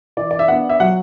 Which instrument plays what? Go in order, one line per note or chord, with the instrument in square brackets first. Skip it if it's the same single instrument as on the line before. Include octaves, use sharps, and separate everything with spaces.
[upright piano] E3 D5
D5
E5
B3 D4 F#5
E5
F#3 F#5